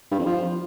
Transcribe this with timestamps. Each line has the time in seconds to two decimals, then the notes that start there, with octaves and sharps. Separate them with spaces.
0.11 G2
0.18 F2
0.26 F3